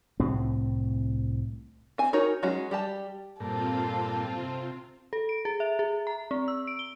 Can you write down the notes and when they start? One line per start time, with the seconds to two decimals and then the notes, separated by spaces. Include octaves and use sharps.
0.20 C2 A2 C4
1.98 C4 G#5
2.13 D#4 F#4 A#4 C#5
2.43 F#3 G#3 C#4 F#4
2.71 G3 G4 A5
3.40 G2 A#2 C4 F4 A4
4.38 C3
5.13 A4
5.29 D7
5.45 G#4
5.60 E5
5.79 G#4
6.07 A#5
6.31 C4
6.48 E6
6.67 D7
6.79 G7